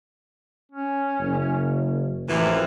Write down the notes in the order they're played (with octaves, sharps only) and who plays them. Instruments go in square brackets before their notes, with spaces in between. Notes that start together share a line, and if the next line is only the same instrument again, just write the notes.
[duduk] C#4
[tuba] F#1
[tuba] A1 [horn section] F#2 C3 E3 [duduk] F3